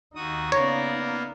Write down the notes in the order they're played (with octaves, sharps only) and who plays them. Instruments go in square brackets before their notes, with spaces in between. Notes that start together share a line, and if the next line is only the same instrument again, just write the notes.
[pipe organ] D#2 F#4 D#6 [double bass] D#4
[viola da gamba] C#3 D5 [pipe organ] A#3 B3 A#4 [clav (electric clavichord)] C#5